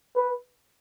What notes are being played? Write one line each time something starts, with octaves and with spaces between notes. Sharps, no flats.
B4